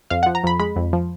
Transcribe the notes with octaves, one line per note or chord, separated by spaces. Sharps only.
F2 F5
F3 F#5
A#5
F2 B5
G#3 B5
F2
F3